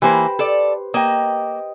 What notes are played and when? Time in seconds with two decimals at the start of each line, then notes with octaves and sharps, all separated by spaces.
0.02 E3 A#3 G4 B4 C5
0.39 A4 D5
0.94 A#3 D#5 G5